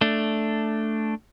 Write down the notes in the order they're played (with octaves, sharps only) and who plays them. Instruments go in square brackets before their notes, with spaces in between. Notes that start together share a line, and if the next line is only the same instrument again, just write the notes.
[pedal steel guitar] A3 D4